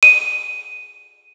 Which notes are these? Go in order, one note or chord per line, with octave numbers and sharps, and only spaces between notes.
D#7